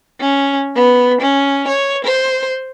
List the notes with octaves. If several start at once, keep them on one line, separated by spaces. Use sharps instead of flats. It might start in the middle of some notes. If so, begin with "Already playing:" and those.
C#4
B3
C#4
C#5
C5